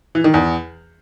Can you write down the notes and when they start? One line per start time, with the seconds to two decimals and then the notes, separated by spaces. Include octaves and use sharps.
0.15 E3
0.24 D#3
0.34 E2